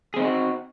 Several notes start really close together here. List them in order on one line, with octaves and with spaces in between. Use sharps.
G#4 C4 D#4 E4 F#4